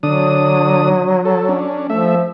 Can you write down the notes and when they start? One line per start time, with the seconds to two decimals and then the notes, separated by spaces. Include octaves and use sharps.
0.03 D3 F#3 D4 D#6
1.25 A4
1.49 C#4 D4
1.90 F3 A3 E5